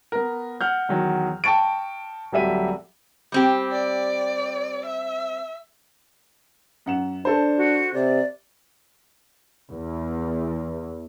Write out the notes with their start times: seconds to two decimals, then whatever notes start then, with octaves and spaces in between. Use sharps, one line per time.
0.12 B3 A#4
0.61 F#5 F6 G6
0.89 E2 D#3 F#3
1.44 G5 A5 C#6 A6 D7
2.32 D1 F#3 G3 E5 D#7
3.32 G3 C4 G4
3.72 D5
4.86 E5
6.86 F#2 F#5 E7
7.25 D4 A4 C5
7.57 F#4
7.94 C3 D5
9.69 E2